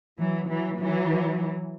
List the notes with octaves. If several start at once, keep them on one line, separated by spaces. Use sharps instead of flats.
E3 F#3
E3 F#3
E3 F#3